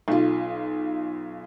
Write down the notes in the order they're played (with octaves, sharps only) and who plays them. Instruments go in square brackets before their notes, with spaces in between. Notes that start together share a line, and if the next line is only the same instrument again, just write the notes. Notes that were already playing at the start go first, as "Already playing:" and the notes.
[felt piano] B1 F4